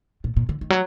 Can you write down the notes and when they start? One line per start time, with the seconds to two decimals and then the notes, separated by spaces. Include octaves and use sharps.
0.24 A#2
0.37 A#2
0.49 D3
0.61 D#3
0.70 F#3